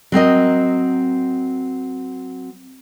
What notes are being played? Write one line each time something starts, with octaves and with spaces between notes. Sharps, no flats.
F#3 C4 A#4 D#5